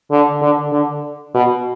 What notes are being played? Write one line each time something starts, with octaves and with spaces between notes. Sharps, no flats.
D3
D3
D3
B2